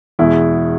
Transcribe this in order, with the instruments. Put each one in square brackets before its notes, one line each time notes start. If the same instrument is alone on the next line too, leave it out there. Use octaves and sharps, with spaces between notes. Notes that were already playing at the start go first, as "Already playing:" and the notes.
[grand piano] E2 B2 G#3 E4